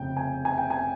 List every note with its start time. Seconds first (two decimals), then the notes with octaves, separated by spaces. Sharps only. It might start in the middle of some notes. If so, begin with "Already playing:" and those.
Already playing: F1 C#3 G5
0.17 G#5
0.45 G#5
0.58 G5
0.70 G#5